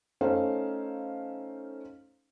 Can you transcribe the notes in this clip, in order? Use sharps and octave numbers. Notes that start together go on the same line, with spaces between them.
A3 C#4 D#4 A4 C5 F5